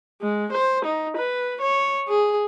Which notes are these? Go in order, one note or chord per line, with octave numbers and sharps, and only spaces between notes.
G#3
C5
D#4
B4
C#5
G#4